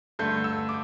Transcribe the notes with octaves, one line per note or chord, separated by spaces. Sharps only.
G2 D3 A3 G6
E6
D6